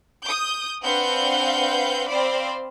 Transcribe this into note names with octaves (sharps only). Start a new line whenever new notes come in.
D#6 G6
C4 D4 B4 F5 F#5 G6
C4 C5 D5 F5 B5